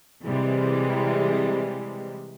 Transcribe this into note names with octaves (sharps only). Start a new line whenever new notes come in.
C3 E3 G3 G#3